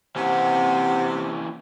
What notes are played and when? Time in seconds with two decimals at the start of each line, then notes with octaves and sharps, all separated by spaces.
0.16 C3 E3 A#3 C#4 F#5